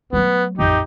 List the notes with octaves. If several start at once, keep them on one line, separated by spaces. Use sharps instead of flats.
F#3 A3 B3
A1 F2 D#4 G4